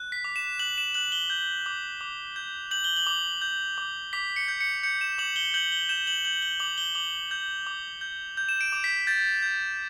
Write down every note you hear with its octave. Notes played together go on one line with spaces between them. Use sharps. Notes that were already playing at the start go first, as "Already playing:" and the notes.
Already playing: F#6
B6
D6
E7
F#6 F#7
E7
F#6 F#7
G7
G6
D6
D6
G6
G6 F#7
G7
F#7
D6
G6
D6
D6 B6
C#7
G6
C#7
G6 C#7
E7
D6 F#7
G7
G6 F#7
G7
G6 E7
F#7
G6 F#7
G7
D6 F#7
G7
D6 F#7
G6
D6
G6
G6
E7
D7
D6
B6
G6 A6
G6